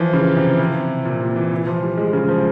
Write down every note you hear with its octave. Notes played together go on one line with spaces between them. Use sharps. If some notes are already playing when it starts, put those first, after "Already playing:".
Already playing: E3 F3
C#3
C3
C3
A#2
C3
E3
E3
F3
G3
G#3
C#3
F3